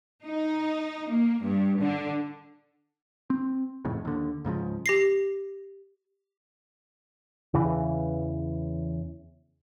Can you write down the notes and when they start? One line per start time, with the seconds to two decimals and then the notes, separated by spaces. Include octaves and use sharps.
0.24 D#4
1.09 A#3
1.42 G2
1.81 D3
3.30 C4
3.85 D#1 F2 A2 C#3
4.05 D#2 D3
4.45 C#2 G#2 C#3 F3
4.86 G4 A#6 C7
7.54 E2 C#3 E3